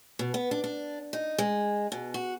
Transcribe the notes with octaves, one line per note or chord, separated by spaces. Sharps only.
B2
B3
D4
D4
D#4
G#3
B2
F#4